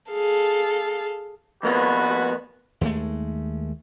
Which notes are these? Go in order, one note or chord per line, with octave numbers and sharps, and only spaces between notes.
G#4 A4 F5
F2 A#3 B3 F#4 B4
D#2 G#3 A3